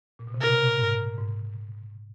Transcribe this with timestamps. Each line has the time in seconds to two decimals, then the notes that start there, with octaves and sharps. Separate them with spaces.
0.19 A#2
0.27 B2
0.34 C3
0.41 C#3 A#4
0.47 B2
0.54 C3
0.66 A#2
0.80 G#2
1.18 G#2